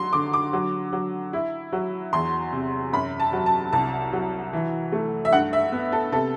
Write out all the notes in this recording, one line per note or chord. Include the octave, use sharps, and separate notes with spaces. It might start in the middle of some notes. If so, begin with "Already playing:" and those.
Already playing: F#3 C6
D3 D6
D6
F#3
F#3
E4
F#3
E2 C6
C3
F#2 B5
A5
F#3
A5
C2 A5
F#3
E3
A3
E5
G2 F#5
E5
B3
A4
C3 A4